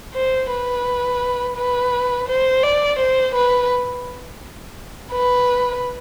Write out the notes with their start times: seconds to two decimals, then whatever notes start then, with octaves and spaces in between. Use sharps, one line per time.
0.14 C5
0.50 B4
1.57 B4
2.28 C5
2.63 D5
2.99 C5
3.35 B4
5.12 B4